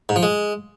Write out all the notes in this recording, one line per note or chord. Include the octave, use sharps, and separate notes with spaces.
G#2
F3
G#3